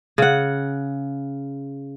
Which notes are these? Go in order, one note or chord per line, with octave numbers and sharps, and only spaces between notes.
C#3 F#5